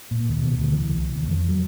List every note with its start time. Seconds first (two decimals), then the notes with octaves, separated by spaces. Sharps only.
0.11 A#2
0.29 D#2
0.43 B2
0.59 D2
0.72 E3
0.90 C2
1.15 D#2
1.28 F2
1.48 F#3